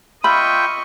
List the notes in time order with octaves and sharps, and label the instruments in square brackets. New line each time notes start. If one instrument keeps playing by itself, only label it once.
[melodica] F4 E5 G5 [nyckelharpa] D#5 C#6 [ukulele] B5